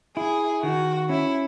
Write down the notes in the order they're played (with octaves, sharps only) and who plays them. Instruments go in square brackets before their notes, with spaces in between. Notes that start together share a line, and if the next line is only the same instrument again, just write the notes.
[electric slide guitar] E4 [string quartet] G#4
[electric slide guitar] D#3 [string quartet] F#4
[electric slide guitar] C#4 [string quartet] E4